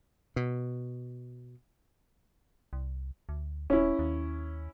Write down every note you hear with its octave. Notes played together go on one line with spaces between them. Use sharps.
B2
C2
D2
D#1 C#4 E4
D#2